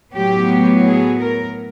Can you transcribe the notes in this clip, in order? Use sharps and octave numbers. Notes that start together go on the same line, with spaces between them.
A2 F#3 B3 G4
G#4
A#4